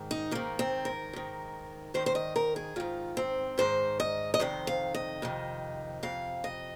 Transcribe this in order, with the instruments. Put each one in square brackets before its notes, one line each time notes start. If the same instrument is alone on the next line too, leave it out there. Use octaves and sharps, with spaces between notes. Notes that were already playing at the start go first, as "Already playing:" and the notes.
Already playing: [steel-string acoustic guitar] G#2 D#3
D#4
G#2 D#3 A#3
C4
A#4
G#2 D#3
G#2 D#3 C5
C5
D#5
A#4
G#4
G#2 D#3 F4
C4
G#2 D#3 C5
D#5
D#5
F2 C3 D#3 C5
F5
D#5
F2 C3 D#3
F2 C3 F5
D#5